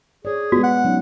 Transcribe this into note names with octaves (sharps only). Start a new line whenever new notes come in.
G#4 C#5 D5
G#3 B3 F#4
F#5
F#3 C#4 D#4